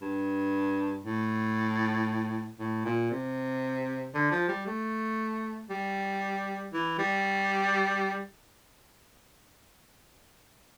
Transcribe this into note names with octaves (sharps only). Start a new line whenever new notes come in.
G2
A2
A2
A#2
C3
D3
F3
G3
A3
G3
E3
G3